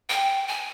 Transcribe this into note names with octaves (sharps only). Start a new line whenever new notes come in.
G5
G#5